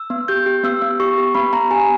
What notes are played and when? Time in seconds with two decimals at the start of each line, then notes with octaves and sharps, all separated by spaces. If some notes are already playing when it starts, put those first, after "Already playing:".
Already playing: E6
0.10 B3
0.28 G4 G6
0.46 G4
0.64 B3 E6
0.82 B3
1.00 G4 C#6
1.18 G4
1.35 B3 B5
1.53 B3 A#5
1.71 G4 G#5